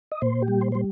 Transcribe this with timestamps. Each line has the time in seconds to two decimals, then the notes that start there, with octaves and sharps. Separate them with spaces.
0.12 D#5
0.22 A#2 C5
0.42 G4
0.48 G3
0.61 C5
0.72 G3 C5